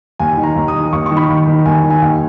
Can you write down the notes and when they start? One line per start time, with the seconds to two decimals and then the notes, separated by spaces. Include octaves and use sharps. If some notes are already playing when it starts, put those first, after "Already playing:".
0.19 D#2 G#5
0.37 D#3
0.43 A#5
0.56 D#2
0.68 D#6
0.75 D#3
0.93 D#2 C#6
1.06 C#6
1.11 D#3
1.17 B5
1.29 D#2
1.47 D#3
1.66 D#2 G#5
1.84 D#3
1.90 G#5
2.02 D#2